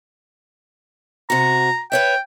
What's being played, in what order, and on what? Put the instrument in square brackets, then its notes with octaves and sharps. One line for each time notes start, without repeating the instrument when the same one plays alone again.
[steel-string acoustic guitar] C3 F#4 [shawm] A#5
[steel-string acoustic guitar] B4 C#5 E5 [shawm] G5